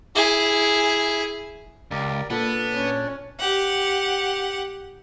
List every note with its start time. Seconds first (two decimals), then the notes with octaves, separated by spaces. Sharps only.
0.15 E4 G#4
1.91 C#2 G4 A#4 D5
2.30 A#2 B3 D4 A4 D5
2.74 C#4
3.40 G4 F#5